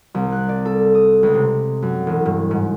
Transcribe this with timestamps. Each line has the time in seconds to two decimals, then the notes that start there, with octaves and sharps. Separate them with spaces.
0.15 C2
0.32 F#6
0.49 D5
0.65 A4
0.95 D#6
1.23 C#2
1.34 C3
1.82 F#2
2.07 E1
2.26 G2
2.51 G#2